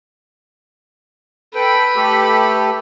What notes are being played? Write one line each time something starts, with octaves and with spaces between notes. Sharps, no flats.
A4 B4 G5 B5
A3 G4 A4